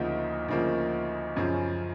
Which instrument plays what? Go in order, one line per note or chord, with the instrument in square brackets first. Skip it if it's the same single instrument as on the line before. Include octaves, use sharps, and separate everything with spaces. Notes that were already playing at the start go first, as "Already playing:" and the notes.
Already playing: [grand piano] D2 C#3 F3 A#3 [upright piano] D#4
[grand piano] D2 C#3 F3 A#3
F#2 C#3 F3